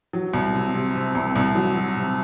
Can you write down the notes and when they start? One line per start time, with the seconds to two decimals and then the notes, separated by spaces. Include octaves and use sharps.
0.13 F#3
0.34 C2
0.54 C3
0.75 C3
0.95 C3
1.15 C2
1.36 C2
1.55 F#3
1.76 F#3
1.97 C3